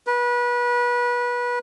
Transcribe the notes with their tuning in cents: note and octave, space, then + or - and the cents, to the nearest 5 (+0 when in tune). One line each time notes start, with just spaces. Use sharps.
B4 -25